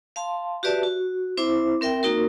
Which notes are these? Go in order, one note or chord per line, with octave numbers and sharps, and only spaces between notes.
F5 A5 C6
F#4 G4 B4 D5 E5 A5
F#4
C4 E4 C5 E5 D6
C4 A#4 E5 G5
A#3 D#4 F#4 A#4